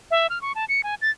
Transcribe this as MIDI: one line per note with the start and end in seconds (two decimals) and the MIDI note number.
0.11 0.27 76
0.30 0.41 89
0.42 0.52 85
0.55 0.65 81
0.69 0.81 97
0.84 0.95 80
1.02 1.10 93